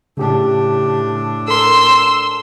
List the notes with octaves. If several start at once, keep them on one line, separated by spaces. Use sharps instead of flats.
A2 C#3 D4 G4
A4 A#4 C6 E6